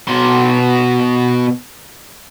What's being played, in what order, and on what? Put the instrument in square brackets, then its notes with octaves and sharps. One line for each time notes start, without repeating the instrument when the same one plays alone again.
[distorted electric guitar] B2 C6